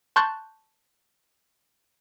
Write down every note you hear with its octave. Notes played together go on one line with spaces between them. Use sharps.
A5 C6 C#6 F#6 G6 A6